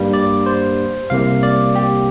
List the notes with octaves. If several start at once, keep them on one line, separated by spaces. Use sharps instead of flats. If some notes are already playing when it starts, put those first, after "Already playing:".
Already playing: G2 G3 A#3
D5
C5
C2 C3 A#3 F5
D5
G4